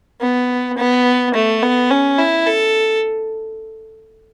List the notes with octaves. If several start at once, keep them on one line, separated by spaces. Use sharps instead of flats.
B3
B3
A3
B3
C#4
E4
A4